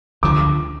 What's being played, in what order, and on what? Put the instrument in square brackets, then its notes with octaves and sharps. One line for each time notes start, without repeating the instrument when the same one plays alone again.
[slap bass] D2 D3 F3 [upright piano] D6